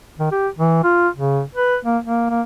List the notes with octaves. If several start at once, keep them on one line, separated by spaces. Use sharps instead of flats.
D#3
G4
E3
F4
C#3
B4
A#3
A#3
A#3